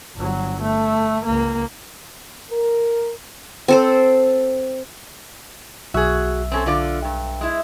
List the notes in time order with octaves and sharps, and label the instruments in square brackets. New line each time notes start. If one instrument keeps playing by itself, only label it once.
[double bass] G1 F#3
A3
C#2 A#3
[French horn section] A#4
[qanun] C4 A4 C5
[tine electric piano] B1 E5 E6 [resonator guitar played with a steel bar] F#4 G#4
[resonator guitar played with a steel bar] C4 C#4 A4
D3 F4 D5
G2
G#3 E4